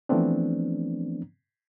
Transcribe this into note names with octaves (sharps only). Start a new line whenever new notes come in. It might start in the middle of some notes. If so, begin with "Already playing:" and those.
E3 F3 A3 B3 C4 D4